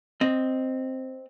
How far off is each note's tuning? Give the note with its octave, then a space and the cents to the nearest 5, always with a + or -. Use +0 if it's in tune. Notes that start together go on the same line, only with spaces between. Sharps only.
C4 +0 D#5 +0